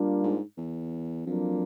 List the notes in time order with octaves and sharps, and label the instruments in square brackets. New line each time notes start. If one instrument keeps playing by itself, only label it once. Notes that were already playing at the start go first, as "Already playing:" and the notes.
Already playing: [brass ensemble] G3 A#3 D4 F4
[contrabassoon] G#2
E2
[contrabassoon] F2 [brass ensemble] F#3 A#3 D4 F4